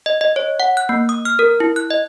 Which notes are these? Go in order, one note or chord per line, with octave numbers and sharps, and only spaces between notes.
D#5
D#5
C#5
F#5
F#6
A#3
D#6
F6
A#4
E4
F#6
D#5